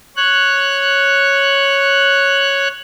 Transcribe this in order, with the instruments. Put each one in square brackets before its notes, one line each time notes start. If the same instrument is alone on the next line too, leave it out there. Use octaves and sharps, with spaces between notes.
[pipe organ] C#5 F#6